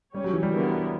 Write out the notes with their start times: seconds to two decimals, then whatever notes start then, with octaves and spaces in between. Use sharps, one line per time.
0.14 G3 C#4 G4 C#5
0.24 F#3
0.33 E3
0.43 G3
0.52 D3 F#3 B3 E4 A#4